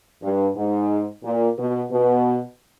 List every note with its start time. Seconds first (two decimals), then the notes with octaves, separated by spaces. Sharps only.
0.22 G2
0.56 G#2
1.24 A#2
1.57 B2
1.91 B2